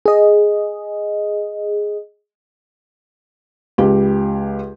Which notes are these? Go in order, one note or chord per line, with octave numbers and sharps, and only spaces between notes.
G#4 D#5
C#2 G4